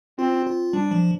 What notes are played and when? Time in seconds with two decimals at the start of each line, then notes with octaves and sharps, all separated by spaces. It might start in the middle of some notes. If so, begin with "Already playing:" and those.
0.19 C4 F4
0.47 F4
0.73 G3 D4
0.91 F3